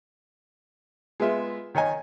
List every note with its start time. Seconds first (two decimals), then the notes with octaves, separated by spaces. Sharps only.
1.20 G#3 B3 F4 E5
1.75 D#3 C#5 D#5 G#5